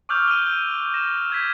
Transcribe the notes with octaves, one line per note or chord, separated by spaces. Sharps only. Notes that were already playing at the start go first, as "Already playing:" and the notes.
C#6 D6 E6 F6 G6 F7
D#7 G7
A#6 E7
F6 G#6 B6